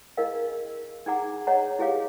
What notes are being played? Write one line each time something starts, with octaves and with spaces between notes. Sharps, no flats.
D4 E4 G#4 A#4 D#5 F5
D4 D#4 G#4 F#5 A#5 D6
G#4 C#5 D#5 F#5 A#5
E4 G4 G#4 C#5 F5 D6